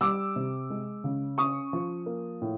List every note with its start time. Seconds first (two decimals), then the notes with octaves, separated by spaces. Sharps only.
0.01 G3 D6 E6
0.36 C3
0.70 G#3
1.04 C#3
1.38 C#4 C#6 D#6
1.73 F3
2.06 A#3
2.42 A2